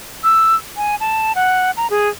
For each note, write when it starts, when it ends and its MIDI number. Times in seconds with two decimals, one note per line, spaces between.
0.24 0.56 88
0.77 0.96 80
1.00 1.32 81
1.35 1.71 78
1.77 1.87 82
1.90 2.09 68